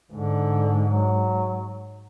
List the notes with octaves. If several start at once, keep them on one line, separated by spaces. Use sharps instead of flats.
G#2 D3
F#3